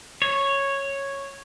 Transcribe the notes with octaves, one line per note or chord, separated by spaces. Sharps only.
C#5